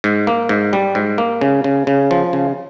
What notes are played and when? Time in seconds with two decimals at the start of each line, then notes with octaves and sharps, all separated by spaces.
0.04 G#2
0.27 A#3
0.49 G#2
0.73 G3
0.95 G#2
1.18 A#3
1.41 C#3
1.64 C#3
1.87 C#3
2.11 F3
2.33 C#3